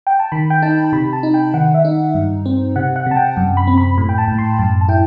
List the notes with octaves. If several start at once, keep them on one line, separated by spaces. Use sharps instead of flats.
G5
A5
D#3 B5
G5
D#4 A5
A5
C3 B5
A5
D#4
G5
D#3 F#5
E5
D#4
G2
C4
C3 F#5
F#5
C3 A5
G5
F#2
B5
C4
B5
A2 B5
G5
A5
A2
C6
F#2 A5
A5
E4 G5